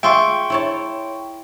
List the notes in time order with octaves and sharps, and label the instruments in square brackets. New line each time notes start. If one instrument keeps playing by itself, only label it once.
[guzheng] F4 G#4 E5 [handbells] G5 C6 C#6
[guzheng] E4 C#5 A5